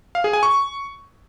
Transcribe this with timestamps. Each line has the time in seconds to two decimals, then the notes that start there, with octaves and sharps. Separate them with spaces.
0.15 F5
0.24 G#4
0.33 G#5
0.43 C#6